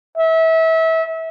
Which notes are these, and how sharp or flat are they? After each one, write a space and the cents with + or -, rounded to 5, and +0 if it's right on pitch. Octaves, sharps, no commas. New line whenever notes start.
E5 -25